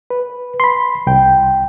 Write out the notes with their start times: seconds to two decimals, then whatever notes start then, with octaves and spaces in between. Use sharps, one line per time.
0.10 B4
0.60 B5 C6
1.07 C2 G5